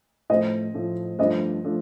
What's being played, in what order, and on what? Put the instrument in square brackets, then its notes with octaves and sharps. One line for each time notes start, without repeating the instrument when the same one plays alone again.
[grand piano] A2 F3 A3 [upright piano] C5 D#5
[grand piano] A2 F3 A3
[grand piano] G2 F3 A3 D4 [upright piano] C5 D#5
[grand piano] F3 A3 D4